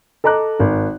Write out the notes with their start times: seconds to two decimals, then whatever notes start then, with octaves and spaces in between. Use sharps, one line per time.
0.24 A4 D#5 A#5 D6 F#6
0.60 G#1